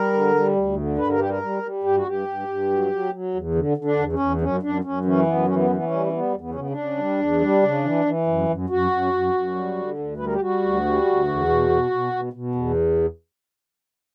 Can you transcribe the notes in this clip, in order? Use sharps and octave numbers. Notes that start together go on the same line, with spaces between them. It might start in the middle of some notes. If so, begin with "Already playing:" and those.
Already playing: G3 A#4
D3
G3
D2
D3
G2 B4
A#4
G3 G4
A#4
G3
G3
G2 G4
F#4
G2 G4
G2
G2
F#3
F#3
F#3
E2
D3
D3
D4
E2
C#4
E2
F#2 C#4
F#2 D4
F#2 C#4
E3 C#4
F#2 B3
E3 C#4
B3
E3
B3
C#4
G3
C#4
G3 B3
E2
B3
C#3 C#4
B3
D4
C#3
G3
E2
G3
C#3
E3
E3
F#2
F#2
F#2 F#4
F#2
F#2
F#2
G3
D3
D2
G3 B4
A#4
G4
G3 F#4
D2
G3
D2
E2
B2
B2
B2
B2
B2
E2